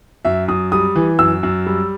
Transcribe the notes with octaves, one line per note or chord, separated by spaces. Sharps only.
F#2 E5
F#2 D#6
G3 D#6
E3
F#2 E6
F#2
G3